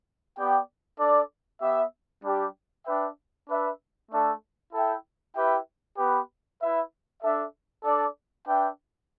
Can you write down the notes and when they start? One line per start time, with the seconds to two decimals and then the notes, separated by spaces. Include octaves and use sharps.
0.37 B3 G4 D5 G5
0.99 D4 A4 D5
1.61 B3 G4 E5
2.24 G3 D4 G4
2.86 D4 B4 E5 G5
3.48 D4 B4 E5
4.10 A3 D4 A4 E5
4.73 E4 A4 E5 G5
5.34 E4 G4 B4 E5 G5
5.97 B3 G4 B4
6.59 E4 B4 E5
7.22 D4 A4 E5
7.84 D4 A4 D5
8.46 D4 B4 E5 G5